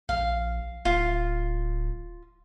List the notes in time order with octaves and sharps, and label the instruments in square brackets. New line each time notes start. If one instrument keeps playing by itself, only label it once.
[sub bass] A#1 [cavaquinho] F5
[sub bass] D1 [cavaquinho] F4